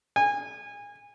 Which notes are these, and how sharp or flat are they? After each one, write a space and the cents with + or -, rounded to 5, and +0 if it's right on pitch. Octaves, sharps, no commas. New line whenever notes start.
G#5 -25